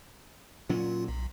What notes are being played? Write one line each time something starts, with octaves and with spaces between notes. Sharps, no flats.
A#2 F#3 C#4 F4
B1